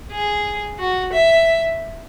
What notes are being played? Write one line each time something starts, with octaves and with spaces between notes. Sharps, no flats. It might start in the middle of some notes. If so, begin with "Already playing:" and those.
G#4
F#4
E5